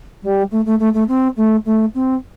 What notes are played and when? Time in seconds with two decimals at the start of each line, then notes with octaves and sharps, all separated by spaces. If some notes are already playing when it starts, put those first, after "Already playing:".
0.22 G3
0.51 A3
0.65 A3
0.79 A3
0.93 A3
1.08 C4
1.36 A3
1.65 A3
1.94 C4